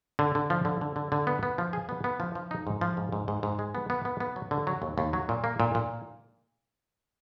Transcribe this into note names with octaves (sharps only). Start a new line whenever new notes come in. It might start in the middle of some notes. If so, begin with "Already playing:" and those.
D3
D3
F3
D3
D3
D3
D3
B3
B3
F3
G#4
B3
B3
F3
F3
D#4
G#2
F3
G#2
G#2
G#2
G#2
G#3
B3
B3
B3
B3
F#3
D3
F#3
D#2
D#2
F#3
A#2
A#3
A#2
A#2